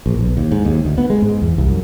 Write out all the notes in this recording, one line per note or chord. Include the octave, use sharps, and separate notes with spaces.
A#1
B1
D#2
G#2
D#2
D2
B3
G#3
G#2
E2
C2
F#2